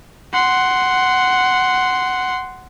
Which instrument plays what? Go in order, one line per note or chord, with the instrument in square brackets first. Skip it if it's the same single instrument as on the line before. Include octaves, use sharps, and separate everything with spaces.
[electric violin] F#5 C6